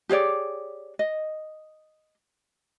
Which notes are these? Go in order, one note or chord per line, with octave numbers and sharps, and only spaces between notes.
G4 G#4 C#5 D5
D#5